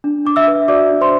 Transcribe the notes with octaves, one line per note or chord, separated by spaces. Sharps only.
D4
D4 D6
E5 E6
B4
F#4 D5 D6
D4
C5 C6